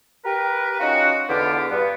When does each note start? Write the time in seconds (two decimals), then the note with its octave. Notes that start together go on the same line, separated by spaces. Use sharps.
0.24 G4 A#4 B4
0.80 C#4 D#4 F4 F#4
1.29 E2 D3 B3 F4 G4 D5
1.70 G2 B3